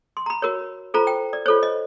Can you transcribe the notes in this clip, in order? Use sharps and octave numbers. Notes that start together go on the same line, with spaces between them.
C6
A#5
B5
F#4 A#4 C#5
F4 A4 C5 A#5
G5
D5
F4 A4 C5 C#5
D#5